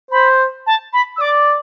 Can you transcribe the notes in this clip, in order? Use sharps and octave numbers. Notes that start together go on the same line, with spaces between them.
C5 B5
A5
B5
E6
D5 D6